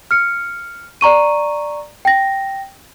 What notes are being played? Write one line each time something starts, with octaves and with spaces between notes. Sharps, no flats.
F6 C#7
D5 A#5 C#6 D#7
G5 A#6